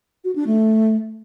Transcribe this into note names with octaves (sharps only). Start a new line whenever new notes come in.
F#4
D4
A3